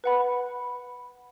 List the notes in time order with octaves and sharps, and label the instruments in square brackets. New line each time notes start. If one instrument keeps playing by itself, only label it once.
[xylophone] B4 F#5 B5